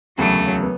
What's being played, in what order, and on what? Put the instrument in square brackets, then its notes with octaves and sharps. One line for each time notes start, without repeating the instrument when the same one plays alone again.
[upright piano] E1 D2 C#3 [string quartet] F#3 A3
[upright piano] B3